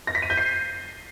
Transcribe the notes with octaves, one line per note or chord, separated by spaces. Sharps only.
A#6
B6
D#7
G6
C7